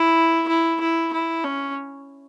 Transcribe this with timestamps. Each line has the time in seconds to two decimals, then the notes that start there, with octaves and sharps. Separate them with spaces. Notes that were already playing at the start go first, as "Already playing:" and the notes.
Already playing: E4
0.48 E4
0.80 E4
1.13 E4
1.44 C#4